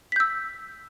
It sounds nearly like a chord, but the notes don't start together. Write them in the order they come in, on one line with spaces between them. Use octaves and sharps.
B6 G6 E6